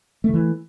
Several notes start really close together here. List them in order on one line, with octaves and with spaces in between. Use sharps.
A3 D#3 E3